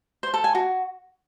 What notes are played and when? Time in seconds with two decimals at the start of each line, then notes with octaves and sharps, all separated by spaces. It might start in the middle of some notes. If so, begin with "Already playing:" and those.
0.23 C5
0.34 A4
0.44 G#5
0.55 F#4